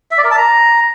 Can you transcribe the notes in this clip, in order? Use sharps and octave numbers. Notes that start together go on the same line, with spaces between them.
E5
D5
A#4
A5
A#5